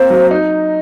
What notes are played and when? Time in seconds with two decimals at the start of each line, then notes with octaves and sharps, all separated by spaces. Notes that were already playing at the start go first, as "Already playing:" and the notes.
Already playing: A#3 C4 C5
0.10 F#3
0.31 D#4